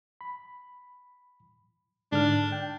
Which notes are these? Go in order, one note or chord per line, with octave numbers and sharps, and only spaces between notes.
B5
G#2 D3 D4 F6
G5